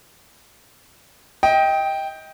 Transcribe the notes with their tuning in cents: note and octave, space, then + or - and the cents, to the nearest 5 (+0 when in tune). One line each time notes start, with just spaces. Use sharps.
D#5 +25 G5 +0